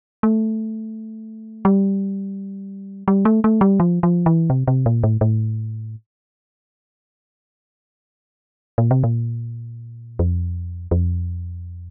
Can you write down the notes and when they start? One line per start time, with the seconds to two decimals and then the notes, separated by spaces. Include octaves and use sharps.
0.23 A3
1.65 G3
3.08 G3
3.25 A3
3.44 A3
3.61 G3
3.80 F3
4.03 F3
4.26 E3
4.50 C3
4.68 C3
4.86 A#2
5.03 A2
5.21 A2
8.78 A#2
8.91 C3
9.04 A#2
10.19 F2
10.91 F2